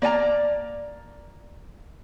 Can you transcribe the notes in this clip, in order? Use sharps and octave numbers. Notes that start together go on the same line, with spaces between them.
A#3 D5 G#5 A#5